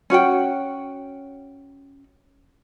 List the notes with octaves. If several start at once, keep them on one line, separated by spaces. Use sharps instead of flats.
C#4 F#4 F#5 G5